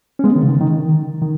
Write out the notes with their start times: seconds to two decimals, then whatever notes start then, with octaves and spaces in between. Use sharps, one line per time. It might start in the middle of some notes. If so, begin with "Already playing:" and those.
0.19 C#4
0.24 G#3 B3
0.36 D#3
0.43 C#3
0.48 D#3
0.61 D#3
0.73 D#3
1.22 D#3